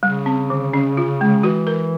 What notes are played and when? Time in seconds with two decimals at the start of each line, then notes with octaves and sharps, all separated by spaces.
0.02 C#3 G3
0.26 C4
0.50 D3
0.73 C#4
0.97 F4
1.21 G#3
1.43 E3 F#4
1.67 A#4